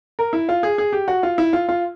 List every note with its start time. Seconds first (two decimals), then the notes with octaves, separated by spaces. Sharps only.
0.19 A#4
0.33 E4
0.49 F4
0.63 G#4
0.78 G#4
0.93 G4
1.08 F#4
1.23 F4
1.38 E4
1.53 F4
1.69 F4